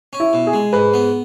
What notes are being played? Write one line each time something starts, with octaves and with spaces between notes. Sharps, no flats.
C#4
E4
B2
G#4
G#3
G#2 B4
B3